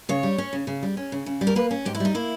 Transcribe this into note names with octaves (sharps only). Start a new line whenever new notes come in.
C#3 C#5
G3
C#4
C#3
C#3
G3
C#4
C#3
C#3
G3
A#4
A#3 B4
C#4
G#2 G4
E4
G3 D#4
A#3 E4